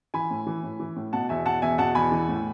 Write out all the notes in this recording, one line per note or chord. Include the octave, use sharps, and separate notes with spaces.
E3 G#5 B5
A2
E3
A2
E3
A2
B2 F#5 A5
E2 E5 G#5
B2 F#5 A5
E2 E5 G#5
B2 F#5 A5
E2 G#5 B5
E3
A2